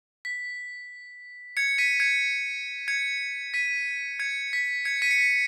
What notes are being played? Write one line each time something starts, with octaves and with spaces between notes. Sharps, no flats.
B6
G#6 C#7
B6 D#7
G#6 C#7
G#6 C#7
B6 D#7
G#6 C#7
B6
G#6 C#7
B6 D#7
C#7
B6